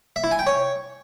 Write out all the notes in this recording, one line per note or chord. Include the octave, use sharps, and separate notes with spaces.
E5
E4
G#5
G5
C#5